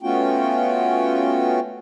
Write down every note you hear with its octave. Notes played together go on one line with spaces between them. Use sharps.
A3 B3 C#4 F4 F#4 G5